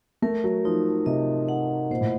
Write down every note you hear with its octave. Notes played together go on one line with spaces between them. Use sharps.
A3 A#4
F#3
F3 D#4
C3 D#5
F#5
A#2 C5
A2